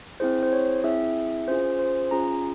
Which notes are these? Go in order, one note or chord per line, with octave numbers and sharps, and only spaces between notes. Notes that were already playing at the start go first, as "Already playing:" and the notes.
C4 E4 G#4 C5
C5
C#5
C4 E4 G#4 E5
C#4 F4 G#4 C5
C5
C#4 F4 G#4 A#5